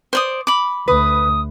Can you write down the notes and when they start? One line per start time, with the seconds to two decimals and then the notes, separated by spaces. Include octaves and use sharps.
0.13 C5 D5 D#6
0.47 B5 D6
0.88 D2 B4 D#6